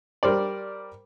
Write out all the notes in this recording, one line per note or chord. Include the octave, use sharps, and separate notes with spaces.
G3 A#4 C5 D5